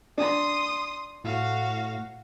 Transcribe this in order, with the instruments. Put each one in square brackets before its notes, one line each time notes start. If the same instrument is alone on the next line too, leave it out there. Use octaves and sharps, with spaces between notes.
[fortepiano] D4 [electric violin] C6 D#6
[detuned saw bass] A2 [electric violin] F#4 F5